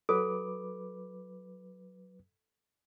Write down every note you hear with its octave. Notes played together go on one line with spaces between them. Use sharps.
F#3 A4 B4 D6